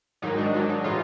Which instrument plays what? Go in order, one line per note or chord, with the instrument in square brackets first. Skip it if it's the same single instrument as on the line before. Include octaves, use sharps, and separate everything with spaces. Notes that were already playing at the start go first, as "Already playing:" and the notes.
[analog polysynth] G#2 D#3 F#3 D#4
D4
G#2 D#3 F#3 D#4
D#4
A2 E3 D#4 F4